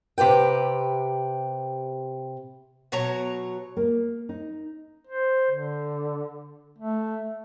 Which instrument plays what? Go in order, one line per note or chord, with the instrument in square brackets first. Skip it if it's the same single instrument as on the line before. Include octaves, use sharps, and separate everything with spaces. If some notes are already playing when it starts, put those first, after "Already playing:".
[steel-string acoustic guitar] C3 G4 B4 G5
[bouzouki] B2 F#3 C#5 A#5
[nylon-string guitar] A#3
D#4
[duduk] C5
D3
A3